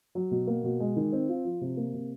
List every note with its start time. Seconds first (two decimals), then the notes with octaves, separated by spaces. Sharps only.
0.15 F#3
0.31 B2
0.47 A#3
0.64 B2
0.80 G#3
0.96 D#3
1.12 C4
1.29 F4
1.45 F3
1.61 C3
1.77 A#3
1.94 C3